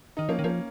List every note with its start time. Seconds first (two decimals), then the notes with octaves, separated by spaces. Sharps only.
0.17 D#3 D#4
0.29 F3 A#3 C#4
0.39 D#3
0.44 F3 A#3 C#4